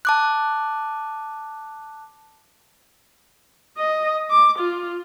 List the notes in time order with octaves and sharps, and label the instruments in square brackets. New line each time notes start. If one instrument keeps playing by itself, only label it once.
[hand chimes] A5 D6 F#6
[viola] D#5
D6
F4